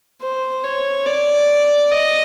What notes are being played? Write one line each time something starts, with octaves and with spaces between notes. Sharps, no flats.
C5
C#5
D5
D#5